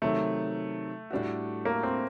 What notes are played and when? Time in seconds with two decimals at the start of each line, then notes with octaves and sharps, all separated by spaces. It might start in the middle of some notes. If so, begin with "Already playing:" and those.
0.02 C3 D#3 F#3 A3
1.11 A2 G3 D4 F#4
1.65 A#3
1.83 C4